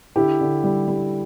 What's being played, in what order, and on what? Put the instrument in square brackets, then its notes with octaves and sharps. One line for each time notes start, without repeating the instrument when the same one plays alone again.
[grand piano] D3 E4 G4
D3
G3
G3